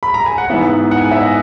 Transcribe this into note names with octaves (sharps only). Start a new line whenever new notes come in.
B5
A#5
G#5
F#5
G#2 E3 B3 E5
F#5
G#5
E5
D#5